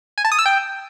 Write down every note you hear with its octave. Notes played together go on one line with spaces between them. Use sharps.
G#5
A5
D#6
E6
G5